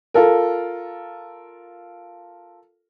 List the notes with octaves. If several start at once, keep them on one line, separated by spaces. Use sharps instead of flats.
F4 A4 A#4